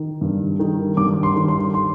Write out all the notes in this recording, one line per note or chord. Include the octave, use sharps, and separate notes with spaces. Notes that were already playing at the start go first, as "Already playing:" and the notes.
Already playing: D#3
G2
D#3
G2 D6
C6
D#3
C6
C6